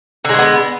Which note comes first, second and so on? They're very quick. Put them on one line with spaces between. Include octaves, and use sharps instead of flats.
D3 G#3 A3 B3